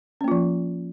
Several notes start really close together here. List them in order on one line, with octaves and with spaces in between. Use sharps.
C#4 A#3 F4 F3